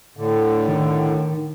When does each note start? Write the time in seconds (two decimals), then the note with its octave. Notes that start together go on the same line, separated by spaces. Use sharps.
0.17 A2 D3
0.68 D#3